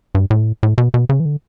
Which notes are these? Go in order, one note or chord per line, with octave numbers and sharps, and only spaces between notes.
G2
A2
A2
B2
B2
C#3
E3
D3